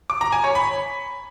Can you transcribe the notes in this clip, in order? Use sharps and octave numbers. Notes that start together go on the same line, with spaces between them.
D6
A#5
G#5
C#5
B5